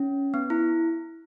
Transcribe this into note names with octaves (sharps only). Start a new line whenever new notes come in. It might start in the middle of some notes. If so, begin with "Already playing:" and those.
Already playing: C#4
B3
E4